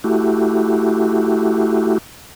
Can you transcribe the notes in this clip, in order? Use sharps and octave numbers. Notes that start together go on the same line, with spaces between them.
A3 E4 F#4 G4